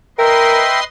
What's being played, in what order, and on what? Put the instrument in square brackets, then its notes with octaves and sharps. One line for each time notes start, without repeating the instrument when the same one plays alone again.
[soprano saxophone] A#4 [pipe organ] B4 D#5 C6 [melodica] E5 G5